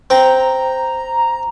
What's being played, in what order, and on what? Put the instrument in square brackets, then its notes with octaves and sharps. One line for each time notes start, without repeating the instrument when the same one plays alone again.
[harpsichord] C4 G5 [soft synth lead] A#5